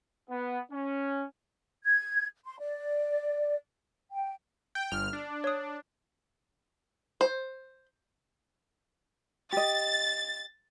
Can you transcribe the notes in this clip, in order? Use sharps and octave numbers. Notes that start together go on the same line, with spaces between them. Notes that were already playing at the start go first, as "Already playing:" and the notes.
B3
C#4
G#6
C6
D5
G5
G5
G1 F6
D4
C#5 D#6
C5
G4 D#5 A6